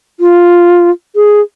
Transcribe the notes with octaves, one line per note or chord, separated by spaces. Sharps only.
F4
G#4